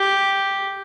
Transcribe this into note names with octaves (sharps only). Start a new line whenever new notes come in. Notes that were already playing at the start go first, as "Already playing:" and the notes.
Already playing: G4